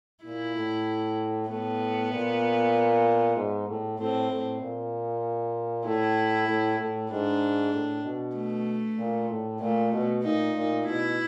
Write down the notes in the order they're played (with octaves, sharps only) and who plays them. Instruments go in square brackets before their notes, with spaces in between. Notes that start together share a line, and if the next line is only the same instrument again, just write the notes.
[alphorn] A#2 [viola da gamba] E4
[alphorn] A2
[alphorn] A2 [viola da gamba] B3
[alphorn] A#2
G#2
A2
[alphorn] A2 [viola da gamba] C4
[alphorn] A2
A#2
[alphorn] A2 [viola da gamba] E4
[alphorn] A2
A2
[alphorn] G#2 [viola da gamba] D4
[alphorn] A2
B2
[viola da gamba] A3
[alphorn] A#2
A2
[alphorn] A#2 [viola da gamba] A3
[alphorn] B2
[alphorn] A#2 [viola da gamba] D#4
[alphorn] A#2
[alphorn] B2 [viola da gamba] E4